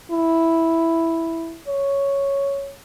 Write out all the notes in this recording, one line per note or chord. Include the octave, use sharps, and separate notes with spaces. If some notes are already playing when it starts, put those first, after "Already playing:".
E4
C#5